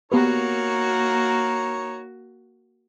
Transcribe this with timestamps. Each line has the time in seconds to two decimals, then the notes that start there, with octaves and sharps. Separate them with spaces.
0.12 A#3 B3 D#4 F#4 G4 A#4 B4 C#5